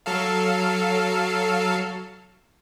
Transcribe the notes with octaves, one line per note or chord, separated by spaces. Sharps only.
F#3 A4 F5